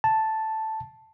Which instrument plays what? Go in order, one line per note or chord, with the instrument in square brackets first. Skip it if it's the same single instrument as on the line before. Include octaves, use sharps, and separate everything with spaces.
[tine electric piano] A5